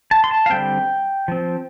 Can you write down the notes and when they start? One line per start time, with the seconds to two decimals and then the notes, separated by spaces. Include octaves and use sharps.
0.11 A5
0.24 C6
0.31 A5
0.46 F5
0.50 D3 G3 C4 G5
1.28 F3 C4